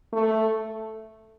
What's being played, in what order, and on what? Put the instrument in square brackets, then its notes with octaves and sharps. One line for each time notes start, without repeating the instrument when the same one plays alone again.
[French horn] A3